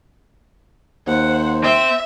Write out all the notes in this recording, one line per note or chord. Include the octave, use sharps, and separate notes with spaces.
D#2 C5 F#5
C4 E5